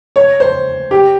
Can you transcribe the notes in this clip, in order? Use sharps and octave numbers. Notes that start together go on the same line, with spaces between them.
C#5
C5
G4